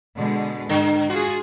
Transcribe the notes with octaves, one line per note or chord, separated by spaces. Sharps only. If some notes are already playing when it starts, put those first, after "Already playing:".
B2 D3 G#3
G#2 D3
F4 F#4 G#4